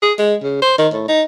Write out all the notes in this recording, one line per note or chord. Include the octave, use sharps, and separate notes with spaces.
G#4
G#3
C#3
C5
D#3
A2
D#4